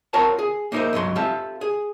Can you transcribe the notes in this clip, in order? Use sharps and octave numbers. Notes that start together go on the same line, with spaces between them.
C4 F4 A#4 C#5 F#5 A5
G#4
A#3 D#4 E4 G4 A#4 C5
C#2 G2 F#3 C6
C4 F4 G4 A4 E5
G#4